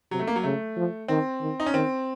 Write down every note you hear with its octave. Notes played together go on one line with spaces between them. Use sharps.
C3 F#3
A3
A#3
F#3
C#3 A3
F3
D#3 C4
D#3
D#4
C#4
D#3 C4